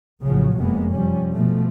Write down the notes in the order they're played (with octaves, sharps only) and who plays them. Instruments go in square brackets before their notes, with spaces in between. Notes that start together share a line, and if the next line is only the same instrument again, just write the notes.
[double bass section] A#1 A2 C#3 F3 F#3
F1 F#2 C3 G#3 A#3 B3
C3 F3 G3 C#4
B2 F3 A3